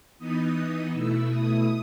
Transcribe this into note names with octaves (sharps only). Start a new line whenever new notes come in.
E3 B3 D#4 D#6
B2 A3 E4 E6
D#6